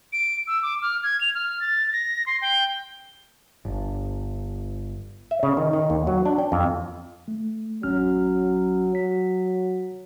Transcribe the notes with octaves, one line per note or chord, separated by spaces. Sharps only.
D7
E6
D6
F6
G#6
F7
F6
A6
A#6
C6
G5
G1
E5
C#3
D#3
D#3
D#2
F#3
D4
G5
F2
A3
A1 F#3 C#4 F6
F#3 B6